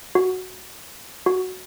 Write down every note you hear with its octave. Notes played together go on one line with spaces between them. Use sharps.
F#4
F#4